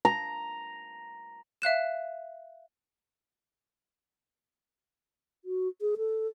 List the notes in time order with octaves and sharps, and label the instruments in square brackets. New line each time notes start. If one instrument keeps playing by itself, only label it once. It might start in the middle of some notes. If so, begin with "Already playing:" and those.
[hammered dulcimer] A#5
[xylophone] E5 F5 F#6 E7
[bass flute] F#4
G#4
A4